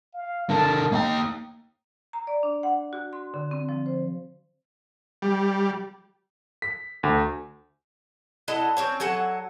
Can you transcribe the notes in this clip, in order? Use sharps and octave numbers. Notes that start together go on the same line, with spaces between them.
F5
D3 A#4 A5
A#3 D#4 G5
A#5
D5
D4
F#5
F#4
C6
D3
C4
F3
C5
G3
B6
D2
E4 A4 D#5 F#5
C4 C#4 C#5
F#3 A4 F#5 G#5